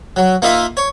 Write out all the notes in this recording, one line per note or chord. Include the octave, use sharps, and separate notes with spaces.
F#3
A#3 D#4 F4 D#5 E5
C#5